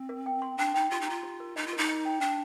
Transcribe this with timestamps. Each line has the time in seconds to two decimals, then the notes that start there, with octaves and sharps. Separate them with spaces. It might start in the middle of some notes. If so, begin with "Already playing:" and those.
Already playing: C4
0.09 A#4
0.26 G5
0.42 C6
0.58 D4 G5
0.74 D#4 G5
0.90 F4 G4
1.01 D#4
1.07 F4 A#5
1.23 G4
1.40 A#4
1.56 D#4 D#5
1.67 F4
1.73 D#4 A#4
1.89 D#5
2.05 G5
2.21 D4 G5